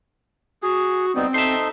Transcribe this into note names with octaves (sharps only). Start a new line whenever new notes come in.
F#4 G#4
G3 B3 C4 D#4
D#4 A4 C5 E5